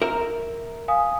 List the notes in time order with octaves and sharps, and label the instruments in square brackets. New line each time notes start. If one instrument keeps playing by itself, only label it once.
[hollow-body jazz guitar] A#4 E5
[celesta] F5 G#5 D#6